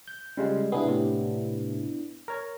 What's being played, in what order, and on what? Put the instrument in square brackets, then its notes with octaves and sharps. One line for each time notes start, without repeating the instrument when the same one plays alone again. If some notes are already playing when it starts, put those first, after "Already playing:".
[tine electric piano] G6
[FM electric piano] C#3 [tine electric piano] G3 G#3 F4
[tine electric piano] C3 G#4 [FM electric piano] B3 D4 E4
[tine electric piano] A2 C3
[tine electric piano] A#4 C#5 [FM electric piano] A#5